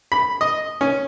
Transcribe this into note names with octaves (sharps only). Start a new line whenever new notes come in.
B5
D#5
C#4